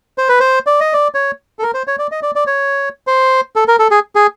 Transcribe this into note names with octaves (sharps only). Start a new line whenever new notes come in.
C5
B4
C5
D5
D#5
D5
C#5
A4
A#4
C5
C#5
D5
D#5
D5
D5
C#5
C5
A4
A#4
A4
G#4
G#4